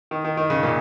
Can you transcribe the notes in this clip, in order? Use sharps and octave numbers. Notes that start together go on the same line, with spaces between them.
D#3
D#3
D#3
C#3
A#2